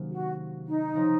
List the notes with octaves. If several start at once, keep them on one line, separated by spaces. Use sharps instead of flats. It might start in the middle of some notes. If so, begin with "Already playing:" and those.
Already playing: C3 D#3 F#3 A#3 C#4
F#4
D#4
C#3 F3 C4